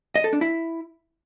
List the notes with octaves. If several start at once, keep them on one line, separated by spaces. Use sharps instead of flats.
D#5
A4
D4
E4